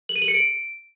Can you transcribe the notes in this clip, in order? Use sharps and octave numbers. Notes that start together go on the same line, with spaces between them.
F#7
D#7
F#7
C#7
D7